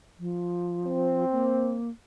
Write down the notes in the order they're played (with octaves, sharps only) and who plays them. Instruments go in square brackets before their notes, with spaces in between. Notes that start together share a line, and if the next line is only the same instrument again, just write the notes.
[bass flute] F3
[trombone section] C4
[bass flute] A#3